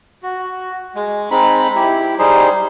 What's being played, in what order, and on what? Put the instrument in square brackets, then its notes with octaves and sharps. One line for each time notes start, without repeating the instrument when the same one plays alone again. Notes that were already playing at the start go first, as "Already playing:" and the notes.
[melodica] F#4
G#3
G#3 C4 D#4 B5
E4 G4
G3 D#4 G#4 C5